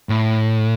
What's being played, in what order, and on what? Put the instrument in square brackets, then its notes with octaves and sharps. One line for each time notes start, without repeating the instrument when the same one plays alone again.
[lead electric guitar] A2